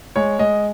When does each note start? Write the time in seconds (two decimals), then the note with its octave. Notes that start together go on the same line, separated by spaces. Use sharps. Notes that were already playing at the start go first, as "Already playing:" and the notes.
0.16 G#3 C#5
0.39 G#3 D#5